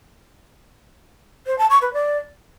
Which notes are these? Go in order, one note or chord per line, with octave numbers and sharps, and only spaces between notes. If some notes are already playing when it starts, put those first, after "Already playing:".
C5
A5
C#6
B4
D5